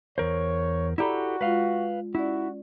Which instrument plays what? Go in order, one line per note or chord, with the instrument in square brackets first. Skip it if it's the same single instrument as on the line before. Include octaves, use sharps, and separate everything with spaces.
[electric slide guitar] E2 A#4 C5 [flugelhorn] C#5
[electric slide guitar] E4 G4 A4 [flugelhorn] F#4 [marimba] D5 A#5 B5
[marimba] G#3 F4 [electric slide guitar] B4 F5
[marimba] C#4 D5 [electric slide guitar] E4 [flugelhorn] F#4